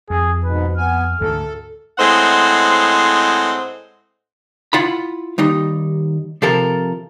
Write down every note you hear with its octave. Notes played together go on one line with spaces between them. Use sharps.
F2 G#4
G#2 B2 B4
B3 G#5 F6
D2 G#2 A4
A2 G#3 C4 C5 D#5 F#5
E4 F4 F#5 B5
D#2 G3 D#4
C3 F3 A4 A#4